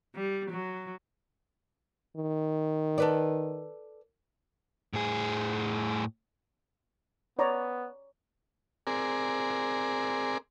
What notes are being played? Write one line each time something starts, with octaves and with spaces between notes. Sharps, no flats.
G3
F#3
D#3
A4 B4 D5
A2 G#4
B3 C#5 D5 A#5
C4 G#4 A#4 D5